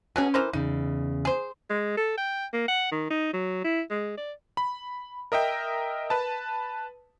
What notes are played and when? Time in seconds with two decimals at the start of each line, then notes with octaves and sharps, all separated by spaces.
0.16 B2 F#3 C#4 G#4 B4 G#5
0.34 E3 A#4 C5
0.53 E2 C#3 D#4
1.25 G#4 C5
1.70 G#3
1.97 A4
2.17 G5
2.53 A#3
2.68 F#5
2.92 D#3
3.10 D#4
3.33 F#3
3.64 E4
3.91 G#3
4.17 D5
4.57 B5
5.32 A#4 D#5 E5 G5
6.10 B4 A5